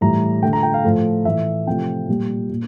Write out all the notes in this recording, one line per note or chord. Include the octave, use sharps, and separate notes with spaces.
A2 E3 G3 A#5
D3 A3 G5
A#5
G5
F5
A2 F3 A3
A2 E3 A3 E5
C3 F3 A3 G5
A#2 G3
A#2